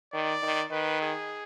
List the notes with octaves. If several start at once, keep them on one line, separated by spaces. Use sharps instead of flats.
D#3 D5
D#3
D#3 B4
G#4